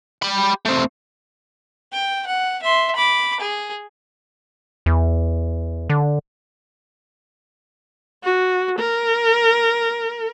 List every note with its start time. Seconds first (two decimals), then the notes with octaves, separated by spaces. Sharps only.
0.22 G4 B5
0.66 A3 C4
1.93 G5
2.27 F#5
2.63 E5 C6
2.96 B5 D6
3.40 G#4
4.86 E2
5.90 D3
8.23 F#4
8.79 A#4